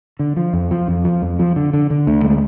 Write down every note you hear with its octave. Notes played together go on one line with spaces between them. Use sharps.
D3
F3
F2
F3
F2
F3
F2
F3
D3
D3
D3
D2
G#3